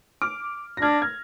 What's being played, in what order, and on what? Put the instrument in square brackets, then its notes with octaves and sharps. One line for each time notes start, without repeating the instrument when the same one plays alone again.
[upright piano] D6 F6
A#6
[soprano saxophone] D4 [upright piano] F6 G#6
[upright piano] F6 G#6